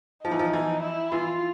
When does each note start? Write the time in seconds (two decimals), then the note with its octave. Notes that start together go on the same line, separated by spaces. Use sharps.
0.25 F3 D#4
0.31 E3
0.39 F3
0.53 E3
0.83 E4
1.12 E3 F4